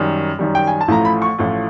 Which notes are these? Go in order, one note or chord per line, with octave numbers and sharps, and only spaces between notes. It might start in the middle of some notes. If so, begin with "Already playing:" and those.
Already playing: F#2 D#3 G3
F#2 D#3 G3
G5
G#5
A5
A1 A2 F3 A3 A#5
B5
C#6
A1 A2 F3 A3